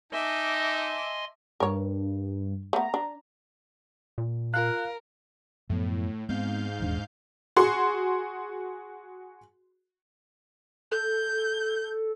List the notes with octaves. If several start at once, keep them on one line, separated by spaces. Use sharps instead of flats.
D#4 D#5 E5 G#5 A5 C6 D6
G2 A#4 C#5
A3 B3 A#5
D4
A#2
F4 A#4 F5 F#6
F#2 A2 F3 B3
G#2 G#3 B3 C4 F5 G6
D#1 E2 D4
F#4 G#4 C6
A4 G6